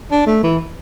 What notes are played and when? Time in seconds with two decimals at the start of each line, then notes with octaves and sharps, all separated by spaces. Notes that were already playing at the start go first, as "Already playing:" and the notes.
0.11 D4
0.27 A3
0.43 E3